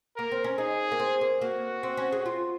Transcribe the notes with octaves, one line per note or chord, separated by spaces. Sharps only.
A#3 A#4
C4
C#4
D#4 G#4
A#3
C4
A#3
A#3 F#4
C4
C#4
G#4
F4